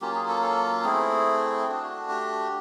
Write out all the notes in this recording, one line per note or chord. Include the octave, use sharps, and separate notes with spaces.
F#3 A#3 C#4 F4 G4
G#4
A4
A4
A3 C4 E4 G#4
A3 D4 F#4
G4